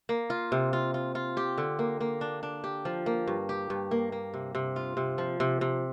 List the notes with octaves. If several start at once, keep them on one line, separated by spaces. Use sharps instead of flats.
A#3
F4
C3
F4
F4
F4
G4
D3
A#3
A#3
D4
D4
G4
F3
A#3
G2
G4
G2
A#3
A#3
C3
C3
F4
C3
F3
C3
C3